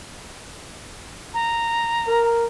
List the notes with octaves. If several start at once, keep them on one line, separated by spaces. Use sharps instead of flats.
A#5
A#4